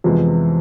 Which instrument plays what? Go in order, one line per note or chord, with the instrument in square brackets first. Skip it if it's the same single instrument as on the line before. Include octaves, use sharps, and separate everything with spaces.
[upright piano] F2 C3 F3 G#3 B3 [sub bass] E3